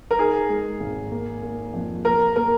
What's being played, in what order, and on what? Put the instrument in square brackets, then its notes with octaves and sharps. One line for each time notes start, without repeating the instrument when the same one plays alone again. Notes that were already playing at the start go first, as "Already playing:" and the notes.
[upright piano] A#4
[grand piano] D#4 [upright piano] G#4
[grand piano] G#3
G#1
A#3
A#3
F2
[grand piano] A#3 [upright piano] A#4
[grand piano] A#3 [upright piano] A#4